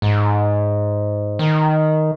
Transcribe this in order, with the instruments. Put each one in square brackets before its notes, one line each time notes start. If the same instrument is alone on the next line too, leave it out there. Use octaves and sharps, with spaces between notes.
[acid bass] G#2
D#3